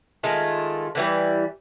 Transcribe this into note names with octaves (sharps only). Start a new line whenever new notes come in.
D#3 G#3 A3 F4
D3 E3 G3